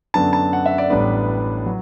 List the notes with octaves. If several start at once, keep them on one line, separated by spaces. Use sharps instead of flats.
F#2 D3 F#3 B3 D4 A5
A5
F#5
E5
D5
A1 A2 G3 B3 D4 B4
F#3